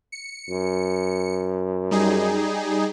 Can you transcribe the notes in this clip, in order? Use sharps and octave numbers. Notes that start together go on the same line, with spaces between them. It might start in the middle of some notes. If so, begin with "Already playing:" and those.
C#7
F#2
G3 D#4 G#4